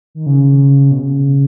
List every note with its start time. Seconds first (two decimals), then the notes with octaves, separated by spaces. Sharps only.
0.15 D#3
0.26 C#3
0.91 B2
1.00 C#3